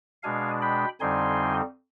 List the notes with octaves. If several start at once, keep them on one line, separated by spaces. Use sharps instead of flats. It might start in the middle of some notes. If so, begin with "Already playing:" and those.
B2 G#3 D4 F5 G#5
G5 B5
F2 D3 G3 C4 D#4 G#5 C6